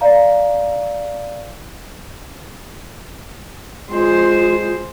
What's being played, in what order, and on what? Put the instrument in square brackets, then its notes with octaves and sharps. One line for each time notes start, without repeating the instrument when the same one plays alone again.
[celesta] D5 F5 A#5
[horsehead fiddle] G#3 C5 [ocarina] F4